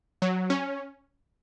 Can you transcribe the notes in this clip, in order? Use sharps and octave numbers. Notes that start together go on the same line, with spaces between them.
F#3
C#4